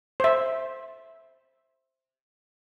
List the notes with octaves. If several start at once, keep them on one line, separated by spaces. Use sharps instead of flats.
C5 E5